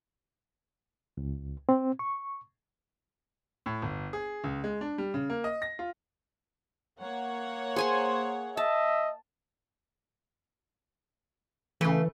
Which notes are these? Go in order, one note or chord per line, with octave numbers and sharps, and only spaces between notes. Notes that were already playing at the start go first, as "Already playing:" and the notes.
C#2
C4
C#6
A2
G1
G#4
C#2
G#3
D4
G3
C#3
A#3
D#5
A#6
F4
A#3 C#5 F#5
G#4 C5 G#5 C6
D#5 E5 A5
C#3 E3 A3